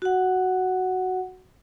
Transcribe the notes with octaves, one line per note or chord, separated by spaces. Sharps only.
F#4 F#5